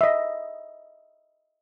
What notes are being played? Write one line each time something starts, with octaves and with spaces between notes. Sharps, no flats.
D#5 E5